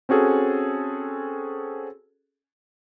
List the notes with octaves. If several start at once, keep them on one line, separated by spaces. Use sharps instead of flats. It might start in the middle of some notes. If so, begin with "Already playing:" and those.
C4 C#4 F#4 G#4 A4